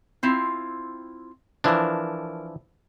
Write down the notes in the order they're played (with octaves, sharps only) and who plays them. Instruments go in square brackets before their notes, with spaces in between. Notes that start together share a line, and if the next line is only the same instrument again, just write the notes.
[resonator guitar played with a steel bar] C4 E4 F4
[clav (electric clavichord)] E3 F3 D4 [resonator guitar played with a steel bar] A#4 A5